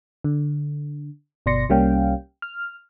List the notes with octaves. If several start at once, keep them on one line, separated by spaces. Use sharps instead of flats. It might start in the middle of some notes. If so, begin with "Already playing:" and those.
D3
G1 B2 D5 C6 A#6 C#7
C2 G3 A#3 C#4 F5 G5
F6